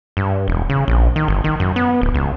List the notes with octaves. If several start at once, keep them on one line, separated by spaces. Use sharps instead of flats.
G2
E1
C#3
A#1
D#3
G1
D#3
F#2
B3
D1
C#2